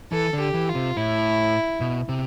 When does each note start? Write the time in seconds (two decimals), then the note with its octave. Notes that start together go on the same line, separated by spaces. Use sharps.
0.12 E3 A4
0.33 D3
0.40 G4
0.54 E3
0.69 F4
0.75 C3
0.96 A2 E4
1.81 B2
2.09 C3